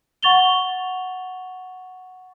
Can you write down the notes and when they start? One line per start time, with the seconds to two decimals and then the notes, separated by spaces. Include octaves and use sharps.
0.23 F#5 C#6 A6 F7 G7